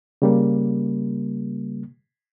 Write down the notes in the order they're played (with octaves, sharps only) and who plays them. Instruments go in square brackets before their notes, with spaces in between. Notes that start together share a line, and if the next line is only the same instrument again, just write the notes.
[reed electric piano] C#3 G3 A#3